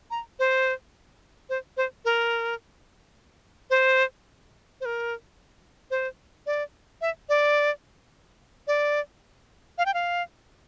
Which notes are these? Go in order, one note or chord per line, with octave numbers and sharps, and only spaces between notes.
A#5
C5
C5
C5
A#4
C5
C5
A#4
C5
D5
E5
D5
D5
F5
G5
F5